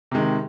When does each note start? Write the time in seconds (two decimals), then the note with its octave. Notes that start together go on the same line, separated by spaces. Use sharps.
0.11 C3 D#3 G#3